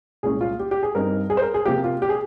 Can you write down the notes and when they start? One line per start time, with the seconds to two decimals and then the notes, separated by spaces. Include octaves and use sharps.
0.23 C2 A#2 G#3 C#4 G#4
0.41 F4
0.60 G4
0.71 G4
0.83 G#4
0.95 G2 G3 C4 D#4 A#4
1.30 G#4
1.37 C5
1.42 A#4
1.54 G#4
1.65 C3 F3 A#3 G4
1.84 F4
2.02 G4
2.09 G#4